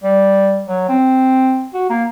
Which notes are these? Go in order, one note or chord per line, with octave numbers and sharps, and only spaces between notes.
G3
F#3
C4
F#4
A#3